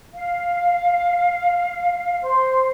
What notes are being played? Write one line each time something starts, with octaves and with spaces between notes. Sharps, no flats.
F5
C5